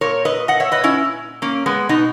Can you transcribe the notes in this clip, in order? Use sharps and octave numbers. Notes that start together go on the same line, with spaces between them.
A#2 A#4 C#5
B4 D#5
D#5 F#5
C#5 E5
B4 D#5
C#4 E4
A#3 C#4
G#3 B3
B2 B3 D#4